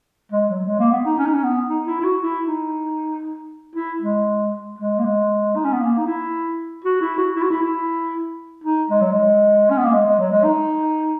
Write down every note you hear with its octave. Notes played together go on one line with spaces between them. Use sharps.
G#3
F#3
G#3
A#3
B3
D#4
C#4
D#4
C#4
B3
D#4
E4
E4
F#4
E4
D#4
E4
G#3
G#3
A#3
G#3
D#4
C#4
B3
A#3
D#4
E4
F#4
E4
F#4
E4
F#4
E4
E4
D#4
G#3
F#3
G#3
C#4
B3
A#3
G#3
G#3
F#3
G#3
D#4